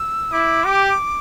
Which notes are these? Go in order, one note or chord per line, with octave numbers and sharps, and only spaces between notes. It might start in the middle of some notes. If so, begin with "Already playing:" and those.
Already playing: E6
E4 D6
G4